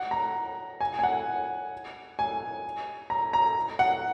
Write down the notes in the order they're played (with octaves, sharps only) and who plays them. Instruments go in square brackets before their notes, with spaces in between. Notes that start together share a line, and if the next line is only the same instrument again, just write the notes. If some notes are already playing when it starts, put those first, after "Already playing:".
Already playing: [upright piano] F#5
A#5
G#5
G#5
F#5
G#5
A#5
A#5
F#5